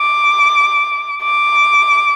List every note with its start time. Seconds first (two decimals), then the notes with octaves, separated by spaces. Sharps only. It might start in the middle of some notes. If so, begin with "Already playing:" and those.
Already playing: D6
1.23 D6